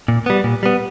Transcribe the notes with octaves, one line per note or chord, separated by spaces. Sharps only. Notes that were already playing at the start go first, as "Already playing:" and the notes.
A#2
G3 B3
A#2
G3 B3